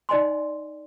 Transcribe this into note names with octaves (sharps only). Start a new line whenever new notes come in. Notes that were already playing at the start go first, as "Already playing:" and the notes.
D#4 D5 D#5 G#5 C6